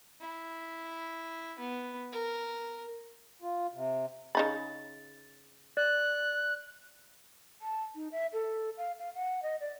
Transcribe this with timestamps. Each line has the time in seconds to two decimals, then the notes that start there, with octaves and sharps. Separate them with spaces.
0.21 E4
1.59 B3
2.12 A#4
3.42 F4
3.74 C3
4.35 C#3 D#4 B5 A6
5.77 D5 F#6
7.62 A5
7.95 D#4
8.12 E5
8.33 A4
8.78 F5
8.99 F5
9.15 F#5
9.43 D#5
9.61 D5